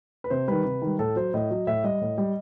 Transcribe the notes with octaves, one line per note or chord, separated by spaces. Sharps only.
B4
C3 C5
D#3 G3 B4
C3
D#3 G3
A2 A4
F#3 C5
A2 D#5
F#3
A2 E5
G3 D#5
A2
G3